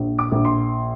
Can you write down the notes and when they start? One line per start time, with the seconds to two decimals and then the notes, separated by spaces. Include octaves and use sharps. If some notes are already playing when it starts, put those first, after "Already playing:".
Already playing: A#1
0.18 D6
0.32 A#1
0.45 C6